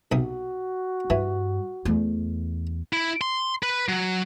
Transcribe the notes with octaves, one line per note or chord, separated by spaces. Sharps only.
B1 C3 F#4 D#6
G2 E3
E2 A3
E4
C6
B4
F#3